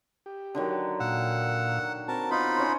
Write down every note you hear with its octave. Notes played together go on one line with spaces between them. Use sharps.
G4
D3 D#3 F#3
A#2 F5 F#5 E6
C4 F#4 A#4 A5
B3 D#4 F4 B5
C#4 C5